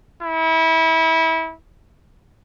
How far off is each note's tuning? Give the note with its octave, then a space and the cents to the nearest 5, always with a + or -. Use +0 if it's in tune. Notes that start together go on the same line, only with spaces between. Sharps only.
E4 -25